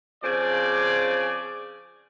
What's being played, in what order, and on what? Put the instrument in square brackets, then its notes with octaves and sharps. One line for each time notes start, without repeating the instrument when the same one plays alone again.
[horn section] C#3 F3 C4 G#4 D5